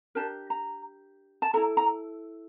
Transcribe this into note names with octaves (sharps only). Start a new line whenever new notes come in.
D4 G4 A#4 A5
A#5
A5
E4 A4 A#5
A#5